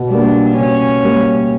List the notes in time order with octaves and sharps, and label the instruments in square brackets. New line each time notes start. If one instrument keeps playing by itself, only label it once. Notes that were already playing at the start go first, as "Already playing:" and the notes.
Already playing: [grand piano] B2
[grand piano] G3 A#3 [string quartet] D4
[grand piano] B2 [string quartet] C#4
[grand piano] G3 A#3